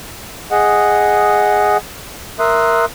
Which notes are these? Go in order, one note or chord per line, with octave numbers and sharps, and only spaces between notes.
G#4 D#5 F#5
A#4 E5 C6 D#6 F#6